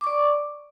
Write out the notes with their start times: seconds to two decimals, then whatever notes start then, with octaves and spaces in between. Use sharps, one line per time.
0.01 D6
0.04 C#6
0.07 D5